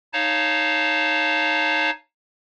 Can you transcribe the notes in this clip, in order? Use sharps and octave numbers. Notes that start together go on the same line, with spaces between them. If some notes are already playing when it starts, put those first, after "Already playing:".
D#4 C#5 F5 A5